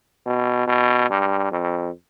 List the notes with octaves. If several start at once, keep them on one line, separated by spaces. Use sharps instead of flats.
B2
B2
G2
F2